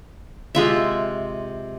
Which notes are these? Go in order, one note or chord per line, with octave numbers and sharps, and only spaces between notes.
C3 G#3 F4 E5